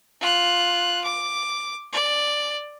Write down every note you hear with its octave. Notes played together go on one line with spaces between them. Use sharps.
F4 F#6
D6
D5